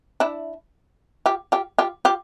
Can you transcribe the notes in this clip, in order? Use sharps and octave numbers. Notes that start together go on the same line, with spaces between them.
D4 E4
F4 G4
F4 G4
F4 G4
F4 G4